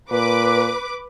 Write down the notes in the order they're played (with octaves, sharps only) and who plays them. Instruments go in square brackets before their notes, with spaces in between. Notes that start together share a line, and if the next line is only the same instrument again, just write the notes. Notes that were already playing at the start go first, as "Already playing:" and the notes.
[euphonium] A#2 [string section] B4 D6